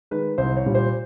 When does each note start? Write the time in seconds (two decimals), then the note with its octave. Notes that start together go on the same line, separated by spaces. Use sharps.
0.11 D#3 G#3 B4
0.38 C2 C5
0.57 C#5
0.66 A#2 G3
0.75 C5